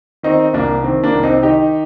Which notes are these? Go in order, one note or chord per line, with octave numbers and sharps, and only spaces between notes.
D#3 C4 D#4
C2 A#3 D4
D#3 C4
A#3 D4
C2
C4 D#4
D#3 D#4 G4